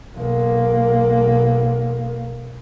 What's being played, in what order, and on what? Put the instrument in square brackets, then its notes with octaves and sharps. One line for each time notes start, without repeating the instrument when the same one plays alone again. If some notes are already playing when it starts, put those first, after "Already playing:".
[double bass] B1 A#3